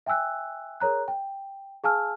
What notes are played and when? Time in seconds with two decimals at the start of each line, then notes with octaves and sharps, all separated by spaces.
0.06 E5 G5 G#5 E6 F#6
0.80 G#4 A#4 C#5 A#5 F#6
1.08 G5
1.84 G#4 F5 G#5 A5 E6 F6